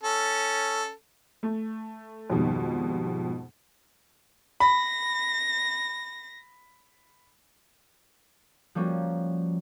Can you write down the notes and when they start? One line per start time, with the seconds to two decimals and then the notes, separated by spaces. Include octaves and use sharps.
0.03 C#4 A4
1.43 A3
2.30 F2 G#2 B2 D#3 G3
4.60 B5 A#6
8.75 F3 G3 A#3 C#4 F#4